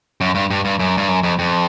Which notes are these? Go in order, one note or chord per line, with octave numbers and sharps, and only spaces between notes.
F#2
G2
G2
G2
F#2
G2
F#2
F2
F2